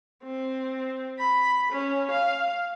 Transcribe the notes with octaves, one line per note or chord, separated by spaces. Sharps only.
C4
B5
C#4
F5